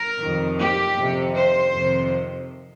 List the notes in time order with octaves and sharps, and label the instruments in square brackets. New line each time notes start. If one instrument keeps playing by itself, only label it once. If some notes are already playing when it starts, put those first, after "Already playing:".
Already playing: [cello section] A#4
F2 C3 D#3
G4
F2 C3 D#3
C5
F2 C3 D#3